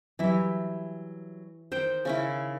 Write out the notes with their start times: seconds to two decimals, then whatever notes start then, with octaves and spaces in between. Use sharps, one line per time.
0.19 E3 F#3 G3 E4
1.72 D#3 C5 G5
2.05 C#3 C#4 E4